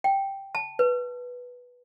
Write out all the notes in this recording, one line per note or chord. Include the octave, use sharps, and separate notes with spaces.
G5
A5
B4